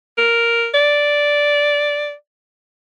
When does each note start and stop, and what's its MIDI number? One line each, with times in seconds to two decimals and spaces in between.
0.18 0.69 70
0.74 2.13 74